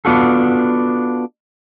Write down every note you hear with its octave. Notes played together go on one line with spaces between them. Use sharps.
B3 D4 F4 F#4 A4